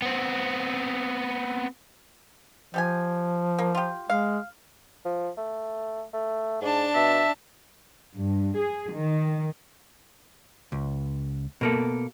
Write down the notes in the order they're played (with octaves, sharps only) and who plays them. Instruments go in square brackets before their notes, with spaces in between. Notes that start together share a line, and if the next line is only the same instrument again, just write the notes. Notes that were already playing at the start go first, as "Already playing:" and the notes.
[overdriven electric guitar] B3 C4
[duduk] F3 [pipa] G3 G4 G#5
[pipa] A#3
F4 G4
[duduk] G#3 [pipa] F5
[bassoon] F3
A3
A3
[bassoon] G#2 [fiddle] D4 A5
[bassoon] B2 [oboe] E5
[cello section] G2
G#4
D#3
[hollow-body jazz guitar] C#2
B2 A#3 A4